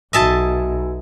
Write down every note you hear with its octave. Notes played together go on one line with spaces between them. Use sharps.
B1 F#4 D#5 E5 G#5 A5 E6